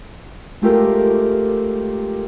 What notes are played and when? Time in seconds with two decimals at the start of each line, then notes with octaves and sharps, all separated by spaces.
0.62 G#3 A3 F4 G4 A4 A#4